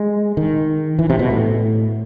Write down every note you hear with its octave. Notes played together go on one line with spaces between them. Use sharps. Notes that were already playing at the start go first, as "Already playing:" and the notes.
Already playing: G#3
D#3
E3
C3
B2
A2